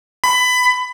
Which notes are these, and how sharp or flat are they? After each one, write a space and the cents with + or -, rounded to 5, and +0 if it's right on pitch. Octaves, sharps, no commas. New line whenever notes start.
B5 +20